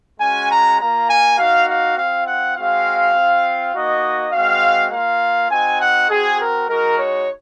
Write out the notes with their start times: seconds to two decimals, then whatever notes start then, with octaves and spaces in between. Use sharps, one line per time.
0.20 G#3 C#4 F#4 G#5
0.50 A#5
0.79 A#3 F4 A#5
1.09 G#5
1.38 A#3 D#4 F#4 F5
1.68 F5
1.97 C4 F4 F5
2.26 F#5
2.56 G#3 C4 F#4 F5
3.14 C4 F4
3.74 A#3 D#4 F#4 D#5
4.33 G#3 C4 F#4 F5
4.91 A#3 F4 F5
5.51 C4 D#4 F#4 G#5
5.80 F#5
6.10 C4 F#4 G#4
6.40 A#4
6.69 G#3 D#4 F#4 A#4
6.98 C#5